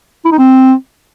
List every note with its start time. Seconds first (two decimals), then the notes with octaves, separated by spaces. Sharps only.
0.25 E4
0.32 D#4
0.38 C4